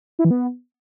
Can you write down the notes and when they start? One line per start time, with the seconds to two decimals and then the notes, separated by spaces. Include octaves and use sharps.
0.19 E4
0.25 E3
0.31 B3